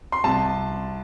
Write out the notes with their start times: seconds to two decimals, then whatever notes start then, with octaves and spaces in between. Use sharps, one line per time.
0.12 C6
0.24 C2 A5